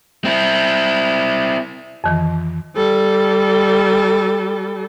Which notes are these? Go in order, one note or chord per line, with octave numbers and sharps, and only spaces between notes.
C4 E4
F2 D#3 E3
G3 A4